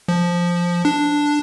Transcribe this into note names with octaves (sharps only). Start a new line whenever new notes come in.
F3
D4